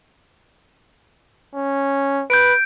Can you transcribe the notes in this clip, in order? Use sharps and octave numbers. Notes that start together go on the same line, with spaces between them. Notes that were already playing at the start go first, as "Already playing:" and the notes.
C#4
B4 G6 D7